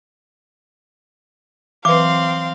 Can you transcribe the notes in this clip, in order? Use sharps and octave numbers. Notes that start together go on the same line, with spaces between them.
E3 F#3 C4 B4 F5 C6 D6